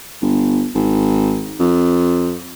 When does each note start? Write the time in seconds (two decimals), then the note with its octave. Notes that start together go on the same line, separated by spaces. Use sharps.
0.22 G1
0.75 G#1
1.60 F2